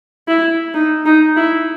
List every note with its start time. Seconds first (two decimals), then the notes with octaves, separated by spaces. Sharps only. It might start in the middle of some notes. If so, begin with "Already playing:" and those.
0.28 E4
0.74 D#4
1.05 D#4
1.37 E4